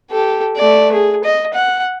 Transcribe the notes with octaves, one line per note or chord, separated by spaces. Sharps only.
G4 A4
A3 D5
G#4
D#5
F#5